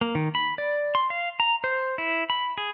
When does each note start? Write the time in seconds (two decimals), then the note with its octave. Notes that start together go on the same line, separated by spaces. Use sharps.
0.01 A#3
0.15 D#3
0.35 B5
0.58 D5
0.95 C6
1.10 F5
1.40 A#5
1.64 C5
1.98 E4
2.30 B5
2.58 G#4